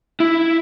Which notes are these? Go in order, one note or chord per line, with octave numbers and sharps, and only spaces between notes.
E4